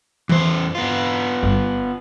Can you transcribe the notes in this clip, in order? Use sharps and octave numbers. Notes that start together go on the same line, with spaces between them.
E2 E3 C5
B3 F4
G1